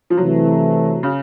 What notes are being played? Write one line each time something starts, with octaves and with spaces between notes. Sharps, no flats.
F3
C3 E3 F#3 A3
C#3